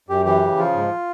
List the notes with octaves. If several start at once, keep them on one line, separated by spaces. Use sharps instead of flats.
F#2 G4
E3 G4
C#3
F3 F4
G#2